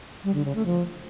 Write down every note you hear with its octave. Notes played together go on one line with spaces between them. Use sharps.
G3
D3
C#3
A3
F3